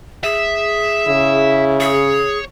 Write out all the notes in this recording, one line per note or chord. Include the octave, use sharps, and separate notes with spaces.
G#4 E5
C#3 E4
G#4 C#5